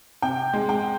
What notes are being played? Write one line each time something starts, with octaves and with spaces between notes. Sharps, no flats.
C3 G5
G#3
G5